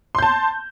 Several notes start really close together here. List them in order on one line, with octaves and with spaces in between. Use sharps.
C6 G6 A5